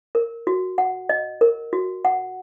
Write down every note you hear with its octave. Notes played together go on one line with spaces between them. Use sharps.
A#4
F#4
F#5
D#5
A#4
F#4
F#5